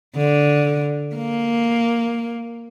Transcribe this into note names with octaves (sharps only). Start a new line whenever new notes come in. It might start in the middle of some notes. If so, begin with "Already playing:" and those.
D3
A#3